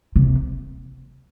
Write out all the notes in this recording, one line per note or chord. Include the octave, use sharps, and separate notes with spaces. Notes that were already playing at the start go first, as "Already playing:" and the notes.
C3